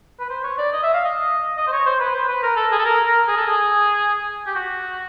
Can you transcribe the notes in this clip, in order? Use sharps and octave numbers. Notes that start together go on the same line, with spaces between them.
B4
C5
C#5
D5
D#5
E5
F5
D#5
D#5
C5
C#5
C5
B4
C5
B4
A#4
A4
G#4
A4
A#4
A#4
G#4
A4
G#4
G4
F#4